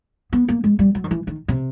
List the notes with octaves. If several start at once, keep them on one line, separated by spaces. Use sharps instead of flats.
B3
A#3
G#3
G3
F#3
D#3
E3
D#3
C3